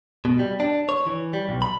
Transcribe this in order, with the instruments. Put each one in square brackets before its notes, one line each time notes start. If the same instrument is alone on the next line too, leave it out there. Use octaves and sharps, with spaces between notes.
[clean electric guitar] B2
G3
D4
C#5
E3
G3
B1
B5